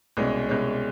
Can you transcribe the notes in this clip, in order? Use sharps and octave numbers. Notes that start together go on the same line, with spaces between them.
C2 B2 G#3 C#4
C2 B2 G#3 C#4